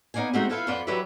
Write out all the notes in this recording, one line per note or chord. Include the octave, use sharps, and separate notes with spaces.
B3 D#4 D5 F5 G#5
G#3 A3 C4 D#4 F#4 G4
E4 F4 A4 B4 E5 F5
F2 F3 F4 B4 D5 F#5
E3 F#3 G4 B4 D5 E5